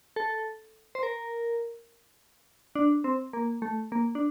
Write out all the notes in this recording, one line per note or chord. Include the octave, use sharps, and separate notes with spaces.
A4
C5
A#4
D4
C4
A#3
A3
A#3
D4